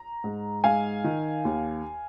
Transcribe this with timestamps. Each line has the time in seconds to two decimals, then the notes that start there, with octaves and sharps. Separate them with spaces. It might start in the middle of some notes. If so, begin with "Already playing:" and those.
Already playing: A#5
0.24 G#2
0.64 G#2 F5 G#5
1.04 D#3
1.45 D#2